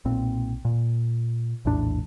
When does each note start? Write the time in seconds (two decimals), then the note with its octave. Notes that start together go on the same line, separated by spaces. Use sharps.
0.05 B1 A#2 C4
0.65 A#2
1.65 A#1 E2 A2 D4